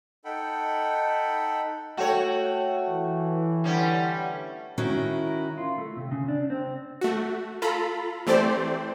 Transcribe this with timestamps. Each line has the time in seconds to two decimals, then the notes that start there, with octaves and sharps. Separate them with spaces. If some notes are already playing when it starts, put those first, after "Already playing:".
0.25 D#4 A4 F#5 G5 B5
1.97 A3 F#4 C#5 G5 C#6
2.90 E3
3.64 D3 G3 C#4
4.78 D#3 C#4 E4 F#4 A#4
5.58 F4
5.78 A3
5.97 C3
6.11 C#3
6.28 D4
6.50 C4
7.01 A3 F#4
7.62 F4 A4 A#5 B5
8.27 E3 A3 C4 G4 C5 D5